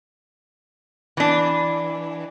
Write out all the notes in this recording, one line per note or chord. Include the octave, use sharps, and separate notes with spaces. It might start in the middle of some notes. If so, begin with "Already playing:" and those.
E3 D4